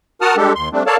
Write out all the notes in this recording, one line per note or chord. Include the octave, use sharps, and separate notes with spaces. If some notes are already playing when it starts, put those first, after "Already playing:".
F#4 A#4 F#5 A5 D#6 F6
G3 G#3 D4 G4 A4
D#2 C6
G3 A3 C4 D4
A4 A#4 C#5 D5 F5 A5